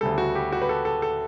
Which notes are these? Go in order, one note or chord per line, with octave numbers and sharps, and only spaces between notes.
D2 C#3 G3 A4
F#4
G4
F#4
B4
A4
A4
A4